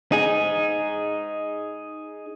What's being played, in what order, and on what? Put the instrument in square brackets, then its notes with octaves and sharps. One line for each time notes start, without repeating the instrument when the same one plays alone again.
[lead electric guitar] D#4 G#4